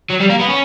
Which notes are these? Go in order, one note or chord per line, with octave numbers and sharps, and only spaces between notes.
F#3
G3
A#3
B3
C#4